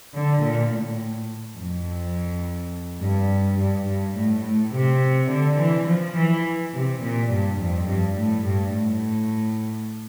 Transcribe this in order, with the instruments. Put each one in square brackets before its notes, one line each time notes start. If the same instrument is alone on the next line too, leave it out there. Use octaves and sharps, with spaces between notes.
[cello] D3
A#2
A2
F2
G2
G2
G2
A2
A2
C3
D3
E3
F3
E3
C3
A#2
G2
F2
G2
A2
G2
A2